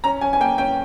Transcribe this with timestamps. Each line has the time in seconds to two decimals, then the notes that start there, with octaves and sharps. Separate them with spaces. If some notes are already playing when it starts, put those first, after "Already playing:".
0.04 C#4 A#5
0.21 C#4 G#5
0.33 G#5
0.41 A#3 G5
0.58 C#4 G5